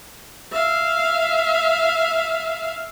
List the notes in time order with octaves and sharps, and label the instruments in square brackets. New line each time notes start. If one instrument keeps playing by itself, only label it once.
[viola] E5 F5